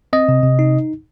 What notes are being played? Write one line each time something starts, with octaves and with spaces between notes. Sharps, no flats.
C4 D#5
C3
C3
D#4